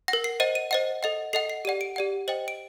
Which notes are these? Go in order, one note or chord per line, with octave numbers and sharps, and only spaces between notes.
F#5 A#6
A#4
C7
C5 D#5 F#5 D#7
D#7
C5 D#5 F#5
A4 D#5 F#5
A4 D#5 F#5 C7
C7
G4 D5 F#5 D#7
D7
G4 D5 F#5
C5 D#5 G5 F#7
D7